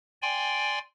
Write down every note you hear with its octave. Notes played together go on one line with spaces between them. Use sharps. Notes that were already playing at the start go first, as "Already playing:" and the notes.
D5 G5 G#5 C6